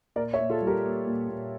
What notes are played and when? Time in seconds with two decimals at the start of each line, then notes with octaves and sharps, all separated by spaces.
0.16 A#2 A#4 D5
0.33 C#5 E5
0.39 A#2
0.50 F4 A4
0.61 G3
0.67 G4 A#4
0.84 A#3
1.07 A#2
1.29 A#2